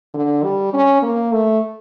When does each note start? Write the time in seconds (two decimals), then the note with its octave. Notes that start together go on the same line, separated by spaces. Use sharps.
0.14 D3
0.43 G3
0.73 C#4
1.02 A#3
1.32 A3